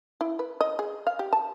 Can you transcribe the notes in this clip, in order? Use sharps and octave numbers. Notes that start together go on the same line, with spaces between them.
E4
B4
D#5
G#4
F5
G4
A5